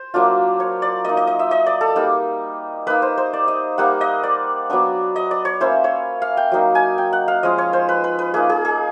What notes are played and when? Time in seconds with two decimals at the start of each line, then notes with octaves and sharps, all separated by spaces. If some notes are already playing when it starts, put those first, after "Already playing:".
Already playing: C5
0.14 F#3 A#3 D4 F4
0.60 C#5
0.82 D5
1.05 A#3 D#4 D#5
1.17 D#5
1.27 D#5
1.39 E5
1.51 D#5
1.66 D5
1.81 A4
1.96 G3 A#3 D#4
2.87 A#3 D#4 B4
3.02 C5
3.17 C5
3.33 D5
3.48 D#5
3.78 G3 A#3 D#4 F#5
4.01 D#5
4.23 D5
4.70 F#3 B3 D4
5.16 D#5
5.31 D5
5.45 C#5
5.60 A#3 C#4 E4 C5
5.84 C#5
6.22 F5
6.37 G5
6.52 F#3 A#3 D#4
6.75 G#5
6.98 G5
7.13 F#5
7.28 F5
7.43 F3 G#3 C#4 D#5
7.58 C#5
7.73 C5
7.89 B4
8.04 B4
8.19 B4
8.34 A#3 D#4 G#4
8.49 G#4
8.65 G#4